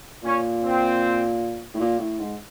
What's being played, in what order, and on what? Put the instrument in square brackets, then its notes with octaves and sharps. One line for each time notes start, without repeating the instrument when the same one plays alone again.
[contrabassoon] A#2 [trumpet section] C#4
[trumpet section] C4
[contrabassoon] A2
A#2
A2
G#2